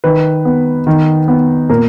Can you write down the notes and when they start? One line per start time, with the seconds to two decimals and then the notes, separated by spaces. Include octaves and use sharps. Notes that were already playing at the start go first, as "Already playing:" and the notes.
0.04 D#3 B4
0.45 B3
0.87 D#3
1.28 B3
1.69 A#2 A#4